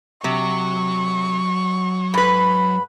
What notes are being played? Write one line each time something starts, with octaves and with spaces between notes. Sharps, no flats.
C3 F#3 C#6
G#2 B4 B5